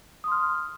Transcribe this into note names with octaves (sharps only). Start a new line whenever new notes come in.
C6 D#6 F6